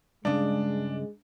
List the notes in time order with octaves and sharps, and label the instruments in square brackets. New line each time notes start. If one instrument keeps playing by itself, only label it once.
[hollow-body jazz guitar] G2 C#3 [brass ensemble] G#3 [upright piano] D4